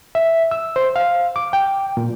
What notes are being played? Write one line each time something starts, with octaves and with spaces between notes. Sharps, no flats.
E5
E6
C5
F5
D6
G5
A#2